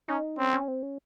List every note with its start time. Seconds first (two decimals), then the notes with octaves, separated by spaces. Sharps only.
0.09 C#4 D#4
0.38 C4 C#4
0.53 C#4
0.68 C4
0.83 C#4